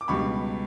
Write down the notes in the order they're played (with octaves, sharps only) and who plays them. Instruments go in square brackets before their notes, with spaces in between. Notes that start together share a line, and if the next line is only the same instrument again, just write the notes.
[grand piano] D6
C#2 B2 G3 B5 C#6